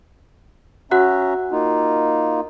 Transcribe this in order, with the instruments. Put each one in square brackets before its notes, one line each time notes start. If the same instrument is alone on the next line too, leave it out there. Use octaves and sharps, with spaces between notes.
[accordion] C#4 E5 A#5 [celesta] F#4 F#5 F#6
[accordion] A#3 D#4 F4